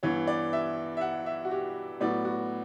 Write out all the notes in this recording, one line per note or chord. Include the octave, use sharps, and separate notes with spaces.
G2 E3 B3 C#5
D5
E5
E5
F#5
E5
F#4
G4
A2 F#3 B3 D5
F#4